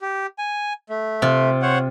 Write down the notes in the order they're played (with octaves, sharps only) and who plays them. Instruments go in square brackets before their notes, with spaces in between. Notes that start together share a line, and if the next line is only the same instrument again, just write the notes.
[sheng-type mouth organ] G4
G#5
A3
[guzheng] C3 F4
[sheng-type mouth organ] C5 C#5 F#5